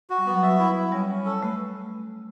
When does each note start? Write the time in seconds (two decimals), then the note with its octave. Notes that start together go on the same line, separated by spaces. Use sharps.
0.10 F#4
0.18 G3
0.26 F#3 B3
0.43 F#3 E5
0.59 E4
0.75 E4
0.92 G3 C#4
1.09 C#4
1.25 A4
1.42 A3 B4